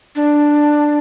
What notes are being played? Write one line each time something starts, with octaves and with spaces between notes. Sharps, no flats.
D4